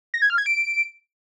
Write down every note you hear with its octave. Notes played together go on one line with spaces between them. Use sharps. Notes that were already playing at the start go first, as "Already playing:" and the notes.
A#6
G#6
F6
G#6
D7